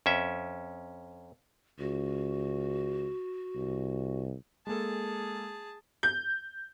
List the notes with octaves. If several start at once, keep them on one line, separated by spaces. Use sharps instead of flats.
F2 C#4 E5
C#2 F#4
C2
G#3 A#3 G#4 A4 A5
G6